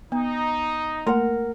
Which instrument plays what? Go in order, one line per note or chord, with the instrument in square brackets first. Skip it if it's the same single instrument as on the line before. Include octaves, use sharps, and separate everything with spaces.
[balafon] B3 [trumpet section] D#4
[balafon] A3 A#3 C6 [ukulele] A#4 F#5